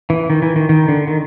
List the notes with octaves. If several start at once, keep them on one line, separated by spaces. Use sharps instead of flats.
E3
D#3
E3
D#3
D#3
D3
D#3